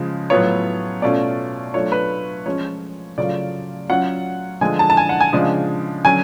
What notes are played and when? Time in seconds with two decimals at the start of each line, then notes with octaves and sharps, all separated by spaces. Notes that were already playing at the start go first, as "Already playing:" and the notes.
Already playing: C#3 F3 G#3
0.30 A2 F#3 B3 F4 C#5
1.02 B2 A3 C#4 F4 D5
1.74 F#3 A3 D4 F4 C#5
1.92 B4
2.45 F3 G#3 C#4 F4 C#5
3.18 C#3 F#3 A3 C#4 F4 D5
3.90 F#3 C#4 F4 F#5
4.61 D3 F3 G#3 G#5
4.79 A5
4.90 A5
4.97 G#5
5.09 F#5
5.21 G#5
5.33 C#3 F3 G#3 D4
6.04 D3 F#3 C#4 G#5